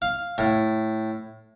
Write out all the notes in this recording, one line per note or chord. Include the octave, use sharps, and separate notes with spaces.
F5
A2